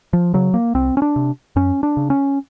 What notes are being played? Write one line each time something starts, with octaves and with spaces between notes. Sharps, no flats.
F3
C#3 F#3
A#3
C2 C4
C#4
D4
C3
F#2 C#4
D4
C#3
C#4